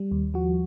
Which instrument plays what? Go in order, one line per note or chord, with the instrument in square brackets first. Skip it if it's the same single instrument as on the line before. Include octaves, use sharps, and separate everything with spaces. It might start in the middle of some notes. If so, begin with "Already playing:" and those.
Already playing: [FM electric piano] G3
D#2
F3 F#4